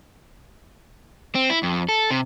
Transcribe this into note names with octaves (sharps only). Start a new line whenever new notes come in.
C4
E4
F2
A4
C3